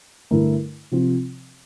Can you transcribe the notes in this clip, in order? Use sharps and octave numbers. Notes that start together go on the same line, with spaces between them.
G2 D3 A3 E4 A#4
C3 F3 C4 F4